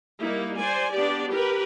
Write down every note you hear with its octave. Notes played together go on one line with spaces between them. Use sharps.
G3 A#3 D#4 E4
C5 D5 G#5
B3 D4 G4 D5
G4 A#4 B4